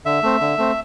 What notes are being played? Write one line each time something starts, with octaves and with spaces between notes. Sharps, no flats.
D3 E5
A3 C4
D3
A3 C4